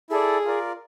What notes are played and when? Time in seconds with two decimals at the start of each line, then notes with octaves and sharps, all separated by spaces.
0.10 E4 G#4 A4 D5
0.45 F4 A#4 D5